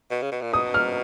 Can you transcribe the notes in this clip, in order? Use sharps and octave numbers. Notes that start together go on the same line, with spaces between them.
B2
C#3
B2
A#2
B2 D#6
F6